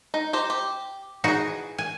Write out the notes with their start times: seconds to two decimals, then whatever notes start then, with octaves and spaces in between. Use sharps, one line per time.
0.14 D#4
0.33 G4 C5 A#5
0.50 G4
1.24 E3 D#4 F#4 G#4
1.78 G#5